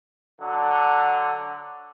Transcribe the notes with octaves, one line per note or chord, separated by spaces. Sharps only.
D3 F#3